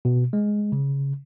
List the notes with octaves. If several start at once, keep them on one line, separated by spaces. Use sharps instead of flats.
B2
G#3
C#3